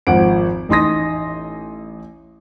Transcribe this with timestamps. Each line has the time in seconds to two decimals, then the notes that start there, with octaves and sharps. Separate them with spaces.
0.07 G#1 F3 F#5 D7
0.69 A1 D#4 C6 D#6 A#6